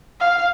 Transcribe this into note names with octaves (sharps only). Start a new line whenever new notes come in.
F5